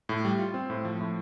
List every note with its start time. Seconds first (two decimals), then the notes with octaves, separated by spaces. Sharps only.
0.09 A2
0.25 G3
0.39 F4
0.54 C4
0.70 A2
0.85 F3
1.00 A2